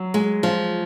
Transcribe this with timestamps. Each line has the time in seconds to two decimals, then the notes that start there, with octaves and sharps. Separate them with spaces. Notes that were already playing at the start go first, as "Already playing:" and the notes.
Already playing: F#3
0.14 G#3
0.43 F3